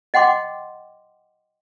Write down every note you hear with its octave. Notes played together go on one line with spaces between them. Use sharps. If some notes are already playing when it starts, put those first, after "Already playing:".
D#5 F#5 G5 C6 D6